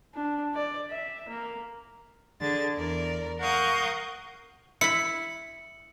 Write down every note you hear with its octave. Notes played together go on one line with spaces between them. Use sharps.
D4
D5
E5
A#3
D3 G#4 A6
E2 A#4 D5
A#4 F5 F#5 C#6 D#6 G6
E4 B5 C#7